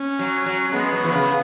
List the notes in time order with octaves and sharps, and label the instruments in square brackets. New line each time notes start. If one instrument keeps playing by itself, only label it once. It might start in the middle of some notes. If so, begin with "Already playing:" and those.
Already playing: [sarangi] C#4
[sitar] F#3
F#3
[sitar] G#3 [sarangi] B3
[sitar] F#3
E3
C#3